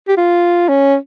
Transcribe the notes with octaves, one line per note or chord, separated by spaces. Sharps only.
G4
F4
C#4